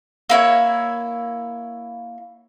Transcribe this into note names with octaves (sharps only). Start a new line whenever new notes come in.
A#3 E4 C#5